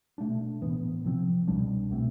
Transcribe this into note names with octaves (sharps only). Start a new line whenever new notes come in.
B2 A3 D4
A2 E3 B3
C3 F3 C4
C2 B2 G3 D4
B2 A3 C4